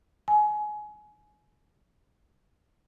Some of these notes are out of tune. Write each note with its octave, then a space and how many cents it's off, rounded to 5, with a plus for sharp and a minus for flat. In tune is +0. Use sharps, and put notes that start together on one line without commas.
G#5 +25